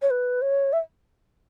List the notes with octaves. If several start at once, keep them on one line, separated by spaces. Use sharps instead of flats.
C#5
B4
C#5
E5